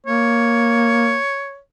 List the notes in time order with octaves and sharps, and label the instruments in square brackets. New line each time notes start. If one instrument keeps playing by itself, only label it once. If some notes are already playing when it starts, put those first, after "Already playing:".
[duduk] A#3 [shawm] C#5